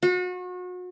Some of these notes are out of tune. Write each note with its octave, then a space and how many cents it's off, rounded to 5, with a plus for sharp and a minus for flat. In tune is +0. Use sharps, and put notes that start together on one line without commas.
F#4 -35